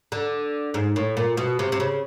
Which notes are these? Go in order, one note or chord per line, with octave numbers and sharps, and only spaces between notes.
D3
G#2
A2
A#2
B2
C3
C3
C#3